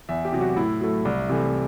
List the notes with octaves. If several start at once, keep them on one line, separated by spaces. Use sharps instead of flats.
E2 E5
G4
C3 F#3
F#4
A2 E4
F#3 A3
C2
C3 E3 A3